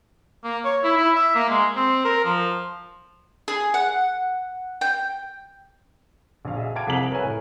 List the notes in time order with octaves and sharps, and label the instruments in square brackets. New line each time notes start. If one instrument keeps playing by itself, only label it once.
[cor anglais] A#3
C#5
E4
E4
E5
A#3
G#3
C4
A#4
F3
[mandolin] G#4
F#5
G5
[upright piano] A#1 F5
G#4 D#5 E5
F5 G5 A5 D6 G#6 D7
C2 F2 G#4 A#5 B6 F#7
A#4 B4 C#5 E5 G#5
A2